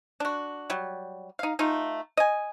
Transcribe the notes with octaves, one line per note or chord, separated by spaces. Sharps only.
D4 F#4
F#3 G3
D#4 F5
A3 D#4 F4
D#5 G#5